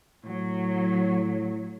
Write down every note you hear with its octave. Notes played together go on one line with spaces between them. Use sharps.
A2 F#3